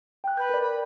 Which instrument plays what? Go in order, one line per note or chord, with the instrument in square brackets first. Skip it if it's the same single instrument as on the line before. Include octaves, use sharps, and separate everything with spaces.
[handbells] G5 F#6
[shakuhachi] B4 [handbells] G6
[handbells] A#4 D5
[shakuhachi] B5